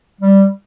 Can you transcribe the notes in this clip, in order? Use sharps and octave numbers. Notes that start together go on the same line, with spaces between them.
G3